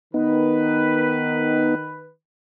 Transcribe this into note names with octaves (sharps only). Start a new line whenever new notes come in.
D#3 B3 D#4 B4